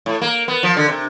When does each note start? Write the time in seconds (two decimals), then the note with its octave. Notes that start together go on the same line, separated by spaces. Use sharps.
0.06 A2
0.22 A#3
0.48 B3
0.63 F3
0.77 D3
0.88 C3